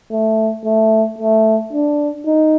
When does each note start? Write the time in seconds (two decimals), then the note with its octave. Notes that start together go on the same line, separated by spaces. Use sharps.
0.12 A3
0.65 A3
1.19 A3
1.73 D4
2.26 D#4